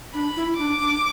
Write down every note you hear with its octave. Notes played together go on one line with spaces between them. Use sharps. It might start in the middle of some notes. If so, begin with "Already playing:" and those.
D4 B5
E4
D4 D6
D4